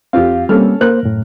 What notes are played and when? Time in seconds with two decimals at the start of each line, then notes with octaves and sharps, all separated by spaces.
0.13 F2 C4 F4 G4 F5
0.49 G3 A#3 C4 C#4 A4 F6
0.81 A#3 A#4 C5 F#6
1.03 F#2 A2